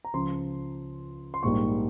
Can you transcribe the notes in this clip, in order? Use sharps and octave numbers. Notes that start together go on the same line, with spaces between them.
A#5
C#2 C#3 F3 C6
C6
A#1 G#2 G3 A#3 C#6